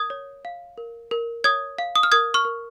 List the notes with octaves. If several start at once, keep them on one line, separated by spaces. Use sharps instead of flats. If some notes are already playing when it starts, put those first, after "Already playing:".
Already playing: A#4 D#6 G#6
C#5
F5
A#4
A#4
C#5 D#6 G#6
F5
D#6
F6
A#4 D#6 G#6
C#6 F6
A#4